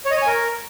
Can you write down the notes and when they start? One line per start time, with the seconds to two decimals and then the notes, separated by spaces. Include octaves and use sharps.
0.06 C#5
0.11 D#5
0.16 C#5
0.22 G#5
0.27 A#4